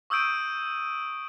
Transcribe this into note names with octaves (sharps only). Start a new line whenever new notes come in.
C#6 D#6 E6 G6 D7 D#7